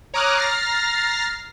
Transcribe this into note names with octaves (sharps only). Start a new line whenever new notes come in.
C#5 A#5 D6 D#6 F6 F#6
A#5 F6 A6 A#6 C7